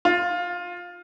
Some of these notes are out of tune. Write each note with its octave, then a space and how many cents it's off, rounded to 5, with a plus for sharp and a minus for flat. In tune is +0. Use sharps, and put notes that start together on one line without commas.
F4 +15